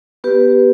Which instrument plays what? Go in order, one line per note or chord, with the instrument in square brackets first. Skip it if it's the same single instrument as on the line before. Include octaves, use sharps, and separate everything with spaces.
[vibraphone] B3 G4 B4